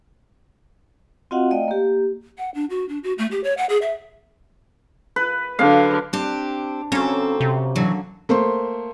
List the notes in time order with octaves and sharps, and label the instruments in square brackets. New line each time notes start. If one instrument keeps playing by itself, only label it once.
[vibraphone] C4 F4 F#4 D#5 F5 F#5
A3 D5 D#5 F5 G5
A#3 G4
[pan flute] F#5
D4
F#4
D4
F#4
A3
G4
C#5
F#5
G#4
E5
[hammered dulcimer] B4
[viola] D3 F#3 [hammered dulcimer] F5
[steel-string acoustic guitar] C4 G4 [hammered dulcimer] D4
[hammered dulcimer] C#3 F#3 A#3 [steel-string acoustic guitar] C4 A4 [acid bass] C#4
[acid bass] C3
[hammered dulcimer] D3 [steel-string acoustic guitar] E3 F#3
[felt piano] A3 A#3 C5 C6